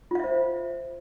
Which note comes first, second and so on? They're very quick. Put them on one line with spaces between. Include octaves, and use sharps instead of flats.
F4 F5 E5 C5